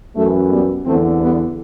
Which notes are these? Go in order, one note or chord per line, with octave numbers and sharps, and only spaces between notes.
F#2 E3 A3
G3 B3
E2 D3 A3 C4
G3 B3